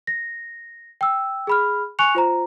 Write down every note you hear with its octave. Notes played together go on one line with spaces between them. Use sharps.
A#6
G5 E6
G#4 B5 F6
G#5 C#6 F#6 C#7 F7
F4 C5 A#5